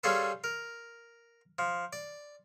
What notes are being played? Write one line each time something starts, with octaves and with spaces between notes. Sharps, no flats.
G3 C#4 F4 G#4 A4 B4
A#4
F3
D5